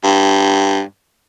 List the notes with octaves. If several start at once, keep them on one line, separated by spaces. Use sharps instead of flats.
G2